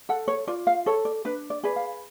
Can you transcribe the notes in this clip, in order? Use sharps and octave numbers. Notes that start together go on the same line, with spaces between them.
A4 F#5
C#5
F4 D5
F5
A4 C#5
D5
D4 B4
D5
G#4 B4 D5
F5